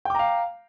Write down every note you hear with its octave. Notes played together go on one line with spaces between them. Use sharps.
F5 G5 A#5 D6